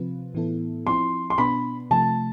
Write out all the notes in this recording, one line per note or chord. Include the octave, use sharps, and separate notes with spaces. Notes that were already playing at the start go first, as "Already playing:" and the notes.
Already playing: C3 F3 C4 F4 B4
A2 E3 B3 E4 A4
F3 C4 E4 C6
C6
B2 B3 D4 B5
C3 F3 A3 A5